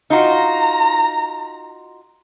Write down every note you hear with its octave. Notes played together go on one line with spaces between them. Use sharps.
D#4 F4 F#4 A#5